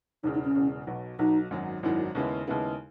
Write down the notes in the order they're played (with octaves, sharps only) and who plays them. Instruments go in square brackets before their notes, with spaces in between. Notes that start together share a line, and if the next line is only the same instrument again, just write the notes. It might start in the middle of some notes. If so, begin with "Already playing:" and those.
[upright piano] E1 E2 C#3 [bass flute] D#4
[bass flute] D#4
C#4
[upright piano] E1 E2 C#3
B1 B2 F#3
[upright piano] B1 B2 F#3 [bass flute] D#4
[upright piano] G#1 F#2 D#3 F#3
[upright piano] G#1 F#2 D#3 F#3 [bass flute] E4
[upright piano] D#2 C#3 G#3 B3 E4
D#2 C#3 G#3 B3 E4